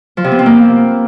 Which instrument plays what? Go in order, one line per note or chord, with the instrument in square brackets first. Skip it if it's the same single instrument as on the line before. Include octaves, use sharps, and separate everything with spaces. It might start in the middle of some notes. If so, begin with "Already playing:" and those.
[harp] F3
C3
B3
C4
A#3